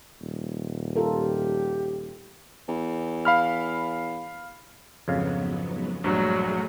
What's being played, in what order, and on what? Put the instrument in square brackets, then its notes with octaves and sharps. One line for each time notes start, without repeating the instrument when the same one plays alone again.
[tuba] D#1
[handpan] F4 A4 A#4 [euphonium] G4
[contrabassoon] E2
[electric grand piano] F5 B5 F6
[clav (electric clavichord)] F2 C#3 F5 [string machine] G#2 F#3 B3
[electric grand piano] A#1 G2 [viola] F#3 [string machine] A3 G#4